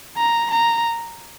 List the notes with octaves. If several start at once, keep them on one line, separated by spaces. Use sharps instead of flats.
A#5
A#5